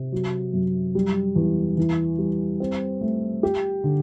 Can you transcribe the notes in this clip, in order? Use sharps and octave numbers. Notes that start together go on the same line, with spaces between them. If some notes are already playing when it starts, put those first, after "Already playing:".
Already playing: C3
F#3
F#2
G3
E2
E3
G3
C4
A3
G4
D3